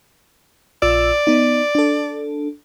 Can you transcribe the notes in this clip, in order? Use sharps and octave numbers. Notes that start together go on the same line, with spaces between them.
A#1 F4 D5 E6
B3 D#4
D4 A4